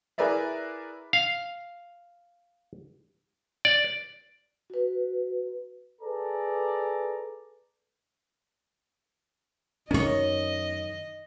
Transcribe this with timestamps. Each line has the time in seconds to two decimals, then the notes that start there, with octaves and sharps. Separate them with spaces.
0.18 E4 G#4 A#4 B4 D5 E5
1.13 F5
3.65 D5
4.70 F#4 B4
6.01 G#4 A4 B4 D5 A#5
9.91 F#2 D#3 C#4 C#5 D#5